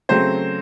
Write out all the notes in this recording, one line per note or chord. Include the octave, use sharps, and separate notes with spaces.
C#3 F#3 A3 C4 C5